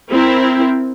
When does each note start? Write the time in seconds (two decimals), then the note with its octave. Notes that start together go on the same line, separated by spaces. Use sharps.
0.11 C4 E4 A#4